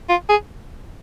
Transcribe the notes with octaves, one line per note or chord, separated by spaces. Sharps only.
F4
G#4